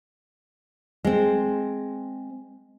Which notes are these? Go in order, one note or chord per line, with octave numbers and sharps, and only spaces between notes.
G#3 C4